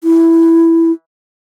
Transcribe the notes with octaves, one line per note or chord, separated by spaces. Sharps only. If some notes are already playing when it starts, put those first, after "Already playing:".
E4